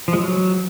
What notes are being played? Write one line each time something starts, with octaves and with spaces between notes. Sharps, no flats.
F3
G#3
F#3